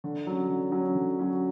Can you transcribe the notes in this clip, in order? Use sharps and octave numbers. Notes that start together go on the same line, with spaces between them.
D3
F#3 C#4
D3
F#3 C#4
D3
F#3 C#4